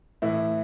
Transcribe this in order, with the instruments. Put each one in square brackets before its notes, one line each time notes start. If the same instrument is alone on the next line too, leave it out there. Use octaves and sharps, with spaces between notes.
[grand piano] A2 E3 E4